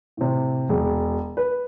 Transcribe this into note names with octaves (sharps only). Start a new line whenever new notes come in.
A2 C3
E1
B4